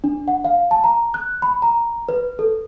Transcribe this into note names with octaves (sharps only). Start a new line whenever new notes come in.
D4
F#5
F5
A5
A#5
F#6
B5
A#5
B4
A4